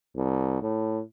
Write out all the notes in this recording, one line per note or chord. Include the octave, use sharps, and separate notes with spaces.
C2
A2